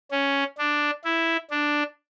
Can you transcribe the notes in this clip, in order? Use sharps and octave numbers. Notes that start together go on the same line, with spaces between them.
C#4
D4
E4
D4